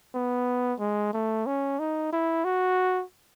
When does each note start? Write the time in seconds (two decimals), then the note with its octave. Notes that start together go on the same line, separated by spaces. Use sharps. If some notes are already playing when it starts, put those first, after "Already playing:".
0.14 B3
0.79 G#3
1.13 A3
1.46 C#4
1.79 D#4
2.12 E4
2.44 F#4